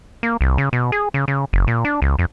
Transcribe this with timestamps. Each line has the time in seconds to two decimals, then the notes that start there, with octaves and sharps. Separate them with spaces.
0.23 A#3
0.41 C2
0.58 C#3
0.73 B2
0.92 G#4
1.14 C#3
1.28 C#3
1.53 F#1
1.67 A#2
1.85 D4
2.02 C#2
2.19 F2